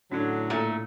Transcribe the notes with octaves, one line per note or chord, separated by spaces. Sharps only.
A2 D3 F#3 C#4 D4
A#2 A3